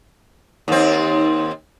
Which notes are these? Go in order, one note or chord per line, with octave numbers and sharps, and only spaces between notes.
D#2 C4